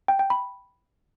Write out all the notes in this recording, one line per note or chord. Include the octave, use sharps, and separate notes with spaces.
G5
G5
B5